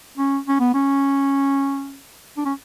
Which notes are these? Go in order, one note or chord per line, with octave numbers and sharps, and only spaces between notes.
C#4
C#4
B3
C#4
D4
C#4